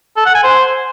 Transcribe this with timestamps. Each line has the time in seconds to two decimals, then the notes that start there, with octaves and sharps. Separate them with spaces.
0.17 A4
0.26 F#5
0.35 G#5
0.44 C5